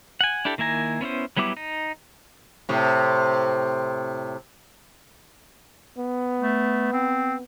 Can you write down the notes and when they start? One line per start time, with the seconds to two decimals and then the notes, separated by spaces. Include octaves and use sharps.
0.21 F#5 G#5
0.45 D4 E4 G4 A4
0.58 D#3 A#3 E4 G#5 A#5
1.01 B3 C#4 E4 C5
1.37 F#3 G3 B3 E4 D6
1.57 D#4
2.69 A2 C3
5.98 B3
6.40 A3
6.93 C4